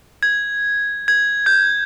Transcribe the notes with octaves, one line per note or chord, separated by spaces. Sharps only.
G#6
G#6
G6